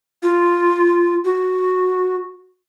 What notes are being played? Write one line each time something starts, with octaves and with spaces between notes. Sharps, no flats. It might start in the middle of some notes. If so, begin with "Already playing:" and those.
F4
F#4